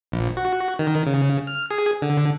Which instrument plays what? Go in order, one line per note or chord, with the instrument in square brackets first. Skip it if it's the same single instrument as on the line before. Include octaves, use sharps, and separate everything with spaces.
[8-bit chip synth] A#1
F#4
D#3
C#3
F6
G#4
D3